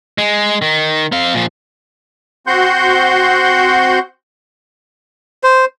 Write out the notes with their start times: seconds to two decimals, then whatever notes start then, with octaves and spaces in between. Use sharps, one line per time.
0.18 G#3
0.62 D#3
1.12 C4 F5
1.34 A#2 F3
2.47 C4 F#4 F#5 C6 G6
5.44 C5